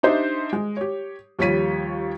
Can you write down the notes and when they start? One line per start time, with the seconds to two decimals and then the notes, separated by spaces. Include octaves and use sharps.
0.03 D4 D#4 G4 C5 D#5 E5
0.53 G#3
0.77 G4 C#5
1.39 D#2 F3 G3 C#5 B6 D#7